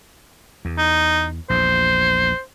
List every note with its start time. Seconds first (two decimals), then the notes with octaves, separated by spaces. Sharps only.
0.65 E2
0.78 D#4
1.50 A#1 E2 C5